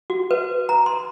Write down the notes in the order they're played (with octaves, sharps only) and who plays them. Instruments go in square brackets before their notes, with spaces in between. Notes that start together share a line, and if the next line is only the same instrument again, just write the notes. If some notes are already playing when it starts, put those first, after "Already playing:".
[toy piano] F#4
B4
A#5
C6